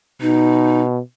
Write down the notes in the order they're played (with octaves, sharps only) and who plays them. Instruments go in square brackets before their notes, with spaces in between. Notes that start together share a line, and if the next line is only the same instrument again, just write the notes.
[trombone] B2 [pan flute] D#4